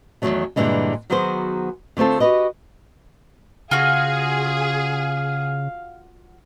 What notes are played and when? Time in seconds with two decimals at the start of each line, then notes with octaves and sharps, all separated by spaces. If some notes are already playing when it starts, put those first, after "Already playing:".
0.22 E2 A2 D#3 F#3 A3
0.56 G2 A#2 D3 E3 G#3
1.10 D#3 F#3 B3 F#4 G#4 C5
1.97 D3 A3 C4 F4 A4
2.20 F#4 G4 B4 D#5
3.71 C#3 F4 F#4 G#4 F5